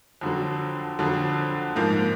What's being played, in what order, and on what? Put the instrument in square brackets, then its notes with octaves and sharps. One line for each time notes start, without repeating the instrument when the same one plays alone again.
[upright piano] F2 D3 F#3
F2 D3 F#3
G#2 F3 A#3